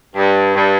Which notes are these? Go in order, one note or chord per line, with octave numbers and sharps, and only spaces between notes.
G2
G2